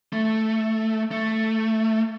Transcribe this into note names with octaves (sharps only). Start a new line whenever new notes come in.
A3
A3